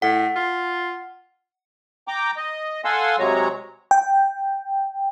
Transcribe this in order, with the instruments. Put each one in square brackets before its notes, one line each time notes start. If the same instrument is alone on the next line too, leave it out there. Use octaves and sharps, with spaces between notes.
[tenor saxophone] A2 [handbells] F#5
[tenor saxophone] F4
[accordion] G5 A#5 D6
D#5
A4 F5 F#5 G#5 C6 E6
C3 F#3 G#3 C#5 A#5
[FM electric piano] G5